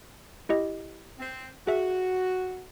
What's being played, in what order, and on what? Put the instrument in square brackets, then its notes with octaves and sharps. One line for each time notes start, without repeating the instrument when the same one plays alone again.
[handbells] E4 G4 D#5
[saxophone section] C4
[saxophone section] F#4 [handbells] G#4 E5